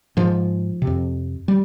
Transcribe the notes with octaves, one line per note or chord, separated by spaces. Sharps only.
G#2 F3
C3
F2
G3